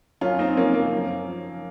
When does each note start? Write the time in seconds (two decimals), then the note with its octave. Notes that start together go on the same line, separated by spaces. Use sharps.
0.21 F#2 C#4 F4
0.39 C4 D#4
0.57 F3 A#3 C#4
0.74 A#3
0.92 F#2
1.28 F3